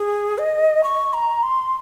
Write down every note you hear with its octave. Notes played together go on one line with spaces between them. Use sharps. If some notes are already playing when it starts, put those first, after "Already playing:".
Already playing: G#4
D#5
C#6
A#5
C6